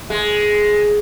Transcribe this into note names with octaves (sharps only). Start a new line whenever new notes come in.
G#3